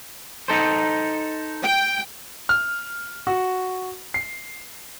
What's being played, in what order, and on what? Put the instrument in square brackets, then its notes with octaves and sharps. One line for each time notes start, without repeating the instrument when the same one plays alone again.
[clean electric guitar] D#4 A4 C5
[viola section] G5
[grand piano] F6
F#4
C7